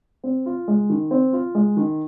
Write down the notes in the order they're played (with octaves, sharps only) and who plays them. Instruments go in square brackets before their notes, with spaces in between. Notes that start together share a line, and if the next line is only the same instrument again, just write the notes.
[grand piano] C4
F4
G#3
D#3
C4
F4
G#3
D#3